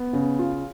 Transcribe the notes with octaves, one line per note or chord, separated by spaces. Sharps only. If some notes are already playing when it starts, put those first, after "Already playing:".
Already playing: B3
C#3
F4